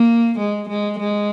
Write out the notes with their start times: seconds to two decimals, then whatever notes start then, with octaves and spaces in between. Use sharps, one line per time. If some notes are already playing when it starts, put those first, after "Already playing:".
Already playing: A#3
0.39 G#3
0.69 G#3
1.00 G#3